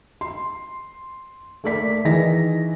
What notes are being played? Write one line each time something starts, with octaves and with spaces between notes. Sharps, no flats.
C6
A3 A#3 A#4 D5 B6
D#3 E3 G#4 D#5 A#6